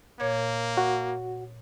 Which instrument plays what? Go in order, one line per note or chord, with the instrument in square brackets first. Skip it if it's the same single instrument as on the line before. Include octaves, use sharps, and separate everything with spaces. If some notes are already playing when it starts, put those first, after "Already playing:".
[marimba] A#2 C#5 G#6 [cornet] A#3
[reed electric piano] F#4